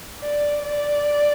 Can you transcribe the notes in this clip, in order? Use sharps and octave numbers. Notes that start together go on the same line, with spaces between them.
D5
D5